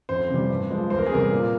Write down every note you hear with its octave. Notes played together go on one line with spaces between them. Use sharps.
F2 C5
C3 E3 G3
G2
F3 G#3
E2 C5
A#4
G#4
C3 G3 A#4
A#2